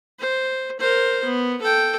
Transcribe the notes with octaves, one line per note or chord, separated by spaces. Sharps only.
C5
A#4 C5
B3
A4 G5